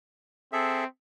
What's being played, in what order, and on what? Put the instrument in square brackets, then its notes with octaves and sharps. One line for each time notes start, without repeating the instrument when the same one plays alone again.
[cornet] C4 [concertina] G#4 A4 E5